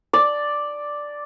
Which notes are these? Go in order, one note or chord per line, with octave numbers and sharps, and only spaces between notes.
D5